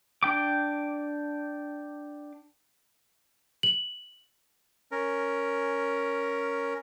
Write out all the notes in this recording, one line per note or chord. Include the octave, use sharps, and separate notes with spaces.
D4 G5 D6
F#7
C#4 A#4